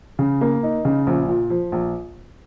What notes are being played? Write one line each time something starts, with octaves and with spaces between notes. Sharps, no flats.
C#3
A#3
D#4
C#3
A#1
A#2
F3
A#1